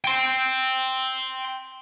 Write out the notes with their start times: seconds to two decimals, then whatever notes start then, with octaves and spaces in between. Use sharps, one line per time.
0.04 G5 C6